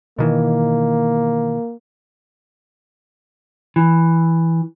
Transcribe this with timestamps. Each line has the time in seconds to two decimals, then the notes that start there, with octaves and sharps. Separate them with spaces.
0.19 B2 D#3 E3 A#3
3.76 E3